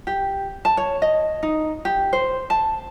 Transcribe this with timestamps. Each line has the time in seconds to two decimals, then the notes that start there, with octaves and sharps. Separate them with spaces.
0.07 G4
0.65 A5
0.77 C#5
1.02 D#5
1.43 D#4
1.85 G4
2.13 C5
2.50 A5